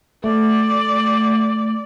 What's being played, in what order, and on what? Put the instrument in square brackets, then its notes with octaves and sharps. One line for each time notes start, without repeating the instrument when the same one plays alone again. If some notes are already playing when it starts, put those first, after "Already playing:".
[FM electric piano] A3 [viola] D5